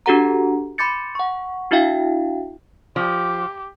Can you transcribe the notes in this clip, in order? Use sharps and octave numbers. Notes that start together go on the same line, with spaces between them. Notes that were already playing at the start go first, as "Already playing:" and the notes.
D4 F#4 G4 A4 F#5 A#5
B5 C6 D6 G6 A6 C#7
F#5 C#6
D4 E4 F#4 E5 F5 G5
F3 G4